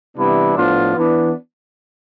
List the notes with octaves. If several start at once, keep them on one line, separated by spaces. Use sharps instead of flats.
C3 E3 G3 B3 D4 E4
A2 F3 B3 D4 F4
E3 B3 D4